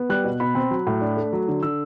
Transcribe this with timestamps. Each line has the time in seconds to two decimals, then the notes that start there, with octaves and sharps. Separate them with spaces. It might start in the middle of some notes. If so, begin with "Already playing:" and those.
Already playing: B3
0.09 G3 F#6
0.24 B2
0.40 B2 B5
0.55 C4
0.71 F#3
0.87 A2
1.01 D4
1.17 A3
1.33 F#3
1.48 D3
1.63 D3 E6